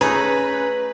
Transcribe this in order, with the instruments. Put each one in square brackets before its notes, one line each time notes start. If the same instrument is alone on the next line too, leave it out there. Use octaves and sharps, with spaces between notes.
[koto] A3 G#4 [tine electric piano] C#4 [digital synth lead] B4 [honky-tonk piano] A#5